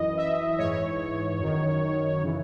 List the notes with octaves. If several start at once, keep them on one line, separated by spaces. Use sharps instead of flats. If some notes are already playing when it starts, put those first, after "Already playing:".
Already playing: F#2 E3 D#5
E5
G#2 E3 C#5
F#2 D#3
C#3 E3